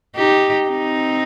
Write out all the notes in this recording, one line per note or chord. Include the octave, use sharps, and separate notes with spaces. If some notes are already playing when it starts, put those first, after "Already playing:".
D#4 G4
C4 D#4